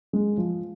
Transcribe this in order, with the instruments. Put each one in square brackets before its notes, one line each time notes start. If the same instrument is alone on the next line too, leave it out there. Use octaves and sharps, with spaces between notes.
[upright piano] G#3
F3